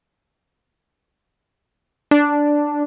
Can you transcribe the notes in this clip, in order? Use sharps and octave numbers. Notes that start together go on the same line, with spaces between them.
D4